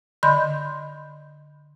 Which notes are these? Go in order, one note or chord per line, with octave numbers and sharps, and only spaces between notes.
D3 D#5 B5 C6 G6